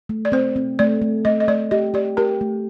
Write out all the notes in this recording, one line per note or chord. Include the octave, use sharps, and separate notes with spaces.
A3
D5
C4 C5
C4
A3 D5
A3
A3 D#5
D#5
A3 D5
G4 D#5
G4 D5
G4 A#4
A3